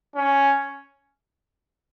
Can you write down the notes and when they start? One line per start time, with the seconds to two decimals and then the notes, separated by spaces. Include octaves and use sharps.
0.16 C#4